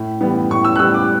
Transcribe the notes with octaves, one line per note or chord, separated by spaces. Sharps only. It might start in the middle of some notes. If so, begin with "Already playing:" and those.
Already playing: A2
E3 G3 B3
A2 C#6
E6
F#6
E3 G3 B3 E6
D6